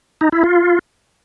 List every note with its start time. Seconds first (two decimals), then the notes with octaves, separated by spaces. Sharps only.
0.21 D#4
0.32 E4
0.44 F4